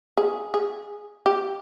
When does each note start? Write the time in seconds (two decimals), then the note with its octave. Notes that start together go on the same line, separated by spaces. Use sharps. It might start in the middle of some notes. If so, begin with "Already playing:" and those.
0.17 G#4
0.54 G#4
1.26 G4